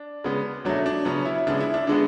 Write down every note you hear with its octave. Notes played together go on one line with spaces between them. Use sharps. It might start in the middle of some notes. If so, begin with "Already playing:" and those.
Already playing: D4
C#3 G#3 B3
B2 F#3 A3 D4
D4
C#3 F#3 B3 C#4
E4
C#3 G#3 B3 D4
E4
D4
D3 G#3 B3 D4